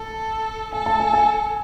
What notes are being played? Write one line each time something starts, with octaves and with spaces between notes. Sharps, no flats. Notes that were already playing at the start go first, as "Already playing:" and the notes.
Already playing: A4 A5
A4 G#5
A5
G#5
G#5